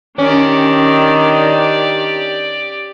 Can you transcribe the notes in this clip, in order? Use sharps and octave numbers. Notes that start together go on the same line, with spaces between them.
D#3 C#4 D4 G4 D5